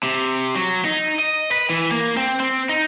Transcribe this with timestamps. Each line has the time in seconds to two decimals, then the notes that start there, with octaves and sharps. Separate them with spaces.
0.03 C3
0.55 F#3
0.85 D#4
1.20 D#5
1.51 B4
1.70 E3
1.91 A#3
2.17 C4
2.40 C4
2.69 D#4